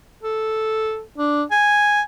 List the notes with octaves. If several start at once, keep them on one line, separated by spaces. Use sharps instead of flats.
A4
D4
G#5